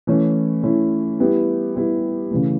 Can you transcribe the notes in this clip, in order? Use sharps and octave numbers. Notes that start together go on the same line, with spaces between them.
E3 A3 C#4 E4
E3 A3 C#4 E4
G3 B3 E4 G4
G3 B3 E4 G4
C#3 E3 A3